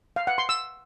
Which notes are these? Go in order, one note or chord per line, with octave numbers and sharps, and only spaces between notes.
F5
F#5
C6
E6